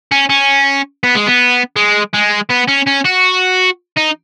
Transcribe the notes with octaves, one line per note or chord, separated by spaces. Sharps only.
C#4
C#4
B3
G#3
B3
G#3
G#3
B3
C#4
C#4
F#4
D#4